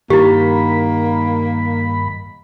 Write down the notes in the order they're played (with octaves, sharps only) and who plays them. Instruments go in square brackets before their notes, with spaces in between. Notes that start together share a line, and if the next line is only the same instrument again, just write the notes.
[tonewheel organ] G2 B5 [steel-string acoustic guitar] D#3 [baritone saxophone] A#3 [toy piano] E4 G4